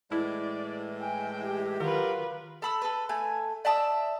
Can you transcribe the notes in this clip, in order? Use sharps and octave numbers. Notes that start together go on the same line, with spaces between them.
A2 E3 G#3 E4 D5
G5 G#5
G4
D#3 F#3 F4 A#4 B4
A4 B5 E6
A4 B4
A3 G#5
D5 E5 A5 D#6